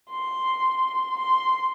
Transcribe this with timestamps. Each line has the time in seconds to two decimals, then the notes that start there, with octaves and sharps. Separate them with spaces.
0.10 C6
1.19 C6